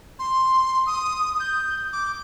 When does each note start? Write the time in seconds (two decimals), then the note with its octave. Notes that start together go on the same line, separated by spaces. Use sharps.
0.19 C6
0.86 D#6
1.40 G6
1.93 D6